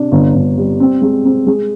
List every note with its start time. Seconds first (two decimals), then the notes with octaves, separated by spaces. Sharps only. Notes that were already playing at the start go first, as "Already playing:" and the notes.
Already playing: C3 D4
0.12 G1
0.35 G1
0.58 G3
0.80 C4
1.02 G#3
1.25 C4
1.47 G#3